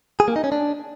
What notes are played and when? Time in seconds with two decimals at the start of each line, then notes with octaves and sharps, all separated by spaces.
0.20 G#4
0.28 A#3
0.36 D#4
0.44 C#4
0.52 D4